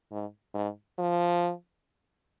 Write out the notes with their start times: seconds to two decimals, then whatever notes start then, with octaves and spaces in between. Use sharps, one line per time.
0.12 G#2
0.54 G#2
0.99 F3